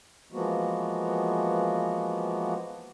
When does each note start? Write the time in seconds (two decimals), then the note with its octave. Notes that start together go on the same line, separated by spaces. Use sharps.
0.33 E3 F3 G#3 A#3 B3 F#4